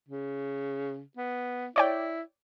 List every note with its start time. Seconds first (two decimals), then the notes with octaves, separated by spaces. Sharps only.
0.09 C#3
1.17 B3
1.76 E4 C#5 D5 G5